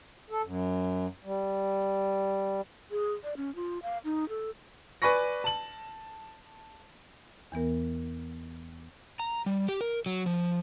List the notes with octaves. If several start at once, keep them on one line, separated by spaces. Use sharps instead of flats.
A4
F#2
G3
G#4
D5
C#4
F4
F5
D#4
A4
B4 D5 G#5 B5 C#6 A#6
A5 F#7
E2 E3 B3 A#4
A#5
G3
G4
A#4
F#3
F3